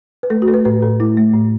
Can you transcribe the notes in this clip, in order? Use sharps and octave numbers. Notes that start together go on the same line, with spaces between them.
B4
A3 A4
F#4
A3 A4
B4
A2 B4
A2 A4
A3 E4
A3
A2